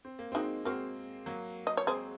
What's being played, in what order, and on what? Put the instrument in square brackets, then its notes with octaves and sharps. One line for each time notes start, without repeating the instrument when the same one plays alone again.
[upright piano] C4
A#3
[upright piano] G#3 C4 [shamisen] D#4 F#4
[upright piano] G#3 C4 [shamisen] F#4 A#4
[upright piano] F#3 A#3
[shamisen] D#5
C#5
[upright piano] G#3 C4 [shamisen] G#4 C5